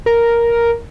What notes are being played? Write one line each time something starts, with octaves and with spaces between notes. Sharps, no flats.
A#4